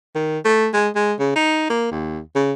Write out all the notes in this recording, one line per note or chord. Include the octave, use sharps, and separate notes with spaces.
D#3
A3
G#3
G#3
C#3
D#4
A#3
D#2
C#3